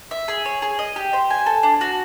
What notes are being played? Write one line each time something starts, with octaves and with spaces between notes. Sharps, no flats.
E5
G#4
C#5
G#4
D#5
G4
C5
G#5
A4
D4
F#4